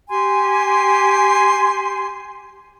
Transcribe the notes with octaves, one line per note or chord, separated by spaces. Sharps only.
G4 G#5 C6